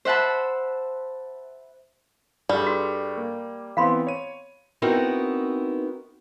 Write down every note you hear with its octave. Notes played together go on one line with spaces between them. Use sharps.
C5 E5 F#5 A5 B5
G2 G3 G#4 A4
F#4
A#3
E3 B3 C4 F5 B5 C6
C#5 D#7
B3 C4 D#4 E4 F#4 A#4